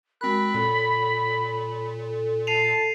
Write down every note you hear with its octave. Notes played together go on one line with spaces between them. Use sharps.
G#3 C4 F#4 A#4 B5 F#6
A#2 A4 C#5
A4
A5 C7 D#7 F7